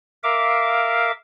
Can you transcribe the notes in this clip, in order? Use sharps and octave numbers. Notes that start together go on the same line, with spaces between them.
A#4 E5 F5 D6